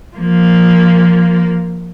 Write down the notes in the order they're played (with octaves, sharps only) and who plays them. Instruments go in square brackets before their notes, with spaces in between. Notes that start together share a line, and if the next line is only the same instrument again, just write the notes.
[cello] F3 A#3